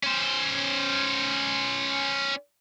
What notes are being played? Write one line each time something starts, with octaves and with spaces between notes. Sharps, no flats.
C#4 C5